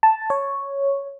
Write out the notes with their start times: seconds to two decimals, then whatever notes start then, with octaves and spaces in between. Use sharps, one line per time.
0.03 A5
0.30 C#5